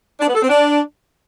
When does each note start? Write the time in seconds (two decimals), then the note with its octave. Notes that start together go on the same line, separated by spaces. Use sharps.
0.20 D4
0.28 B3
0.35 A4
0.42 C4
0.49 D4